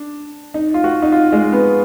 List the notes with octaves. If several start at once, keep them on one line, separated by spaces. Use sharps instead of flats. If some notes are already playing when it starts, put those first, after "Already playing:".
Already playing: D4
D#4
F4
F#4
D#4
F4
G#3
B3